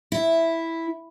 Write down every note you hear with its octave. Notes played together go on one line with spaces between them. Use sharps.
E4